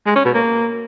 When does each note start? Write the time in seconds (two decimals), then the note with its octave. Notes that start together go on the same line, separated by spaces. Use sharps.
0.06 G#3
0.15 C#4
0.25 B2
0.34 A#3